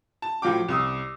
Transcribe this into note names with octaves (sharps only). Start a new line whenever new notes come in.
A5
A2 F3 F#3 F5 G5 D6
C2 D#6 E6